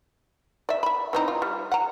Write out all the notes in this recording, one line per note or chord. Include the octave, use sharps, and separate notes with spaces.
D5 E5
E5 B5
E3 C4 D#4
F4
G3
F#5 A#5